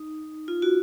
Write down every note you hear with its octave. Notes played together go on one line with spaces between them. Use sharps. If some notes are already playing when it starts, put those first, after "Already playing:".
Already playing: D#4
F4
F#4